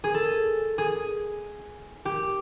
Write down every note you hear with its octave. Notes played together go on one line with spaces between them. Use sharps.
G#4
A4
G#4
G4